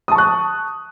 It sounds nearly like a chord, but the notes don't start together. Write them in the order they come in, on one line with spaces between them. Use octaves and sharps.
D#6 A5 C#6 F#6